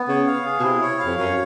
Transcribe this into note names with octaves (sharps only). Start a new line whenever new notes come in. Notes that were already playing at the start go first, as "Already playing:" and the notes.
Already playing: B3
C#3 C#5
F5
G#4
B2
C3 E4
C#5
F5
F2
F#2 C#5